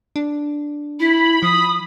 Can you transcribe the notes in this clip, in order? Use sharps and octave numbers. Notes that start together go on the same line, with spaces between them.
D4
E4 B5
F3 D#6